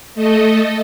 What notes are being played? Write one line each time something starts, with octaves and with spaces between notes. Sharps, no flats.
A3 A4 D#5